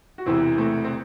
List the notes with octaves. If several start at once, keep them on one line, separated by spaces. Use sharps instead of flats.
F#4
E1 E2 C3 E3 C4 E4
A3 C4
C4